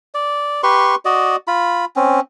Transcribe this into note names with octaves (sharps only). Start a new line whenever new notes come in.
D5
G4 B4 C6 C#6
F#4 D5 D#5
F4 B5
C4 C#4